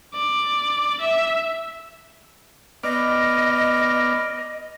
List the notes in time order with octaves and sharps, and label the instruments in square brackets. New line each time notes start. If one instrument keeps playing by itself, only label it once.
[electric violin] D5
E5
[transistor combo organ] B3 D5 F6 [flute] D#5